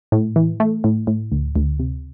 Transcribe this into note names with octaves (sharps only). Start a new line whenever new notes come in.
A2
E3
A3
A2
A2
D2
D2
C3